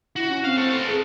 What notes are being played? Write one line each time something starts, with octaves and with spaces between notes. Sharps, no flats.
E4 F#4
C#4
C4 F5
A3 A4
A4 B4
G#4